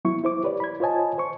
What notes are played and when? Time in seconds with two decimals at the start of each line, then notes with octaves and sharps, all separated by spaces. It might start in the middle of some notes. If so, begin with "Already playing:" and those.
0.05 F#3 B3 E4 C#6
0.24 E4 C5 D6
0.43 G4 B4 C#5 D5
0.60 B5 G#6
0.80 F4 C5 C#5 D#5 G#5 A5
1.18 C5 C#6